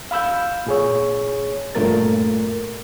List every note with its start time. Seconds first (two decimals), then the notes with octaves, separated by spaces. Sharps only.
0.11 F5 B5 E6 G6
0.66 A#2 G#4 C#5
1.75 G2 A#2 A3 A#4 A6